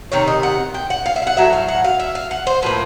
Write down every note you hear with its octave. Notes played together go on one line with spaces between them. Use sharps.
C3 D#3 C#5
D#5
F#5
G5
F#5
F5
E5
F5
F#5
A2 F#3 E5
F5
F#5
F5
E5
F5
F#5
C5
A2 F3 A#3 B4